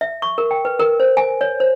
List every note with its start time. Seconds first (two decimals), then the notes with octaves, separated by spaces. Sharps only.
0.01 E5
0.22 C#6
0.38 A#4
0.51 G5
0.65 B4
0.80 A#4
1.00 C5
1.17 G#5
1.41 C#5
1.60 C5